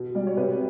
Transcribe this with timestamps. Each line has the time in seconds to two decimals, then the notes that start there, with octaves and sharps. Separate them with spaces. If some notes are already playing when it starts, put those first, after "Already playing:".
Already playing: B2
0.15 G3 D5
0.27 C#5
0.37 C3 B4